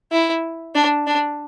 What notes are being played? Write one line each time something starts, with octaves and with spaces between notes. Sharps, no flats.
E4
D4
D4